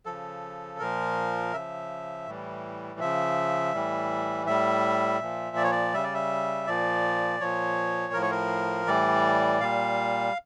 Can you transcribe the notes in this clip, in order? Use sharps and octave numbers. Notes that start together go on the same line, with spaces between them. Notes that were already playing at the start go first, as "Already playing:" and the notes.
C#3 F3 A4
A#2 F3 A#4
C#3 F3 E5
A2 E3 G3
C#3 F3 E5
A2 E3 G3
A2 G3 E5
A#2 F3
D5
C#5
D5
C#3 G3 E5
D5
E5
A#2 F3 D5
A#2 F3 C#5
A2 F3 A#4
C#5
A#4
A2 E3 G3 D5
A#2 G3 F5